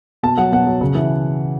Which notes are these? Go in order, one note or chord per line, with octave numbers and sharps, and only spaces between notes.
B2 A5
F#3 F#5
B2 F#5
F#3
C#3
E3